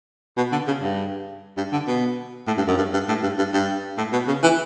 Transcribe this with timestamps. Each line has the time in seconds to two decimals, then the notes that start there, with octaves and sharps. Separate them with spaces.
0.37 B2
0.52 D3
0.67 C#3
0.82 G2
1.57 G2
1.73 D3
1.88 B2
2.47 A2
2.57 G2
2.68 F#2
2.77 G2
2.93 G2
3.08 A2
3.22 G2
3.38 G2
3.53 G2
3.98 A2
4.12 B2
4.27 C#3
4.43 E3